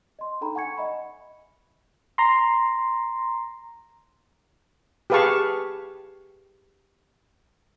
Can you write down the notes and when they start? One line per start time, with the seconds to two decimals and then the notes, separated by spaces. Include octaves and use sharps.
0.19 D#5 C6
0.41 D4 D#4 A4 G5 A#5 B5
0.55 F#5 G#5 C#6 G#6 C#7
0.78 D#5 E5 B5
2.18 A#5 C6
5.10 G4 G#4 B4 F5 A5 C#6